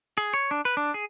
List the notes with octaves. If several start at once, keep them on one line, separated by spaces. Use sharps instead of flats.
G#4
C#5
D4
B4
D4
G#4